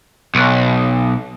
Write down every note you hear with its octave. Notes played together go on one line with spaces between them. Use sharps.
B1